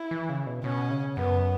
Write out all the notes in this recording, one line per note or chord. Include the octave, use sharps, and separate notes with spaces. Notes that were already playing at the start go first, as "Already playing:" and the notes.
Already playing: E4
E3
C#3
B2
B2 C#4
C#3
F#2 B3